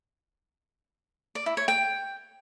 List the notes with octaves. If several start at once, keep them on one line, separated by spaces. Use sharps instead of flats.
D5
E4
C#5
G5